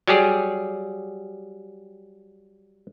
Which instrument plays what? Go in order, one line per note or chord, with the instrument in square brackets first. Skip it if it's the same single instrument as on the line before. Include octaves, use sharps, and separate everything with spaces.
[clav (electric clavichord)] F#3 G3 G4 G#4